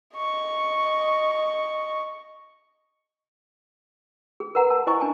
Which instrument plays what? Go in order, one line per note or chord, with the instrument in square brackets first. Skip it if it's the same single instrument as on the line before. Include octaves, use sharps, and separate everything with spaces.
[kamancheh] D#5 C#6
[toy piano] G#4
A#4 B4 F#5 A#5
A#4 A5
E4 C5 D#5 G#5 C#6
D4 G#5 A5